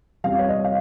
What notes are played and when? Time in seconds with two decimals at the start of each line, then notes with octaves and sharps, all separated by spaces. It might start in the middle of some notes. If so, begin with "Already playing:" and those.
0.24 F2 C3 G3 F5
0.39 C#5
0.49 D#5
0.64 F5